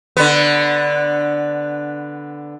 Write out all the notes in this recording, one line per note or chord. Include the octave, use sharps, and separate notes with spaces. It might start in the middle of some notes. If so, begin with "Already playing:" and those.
D3 B3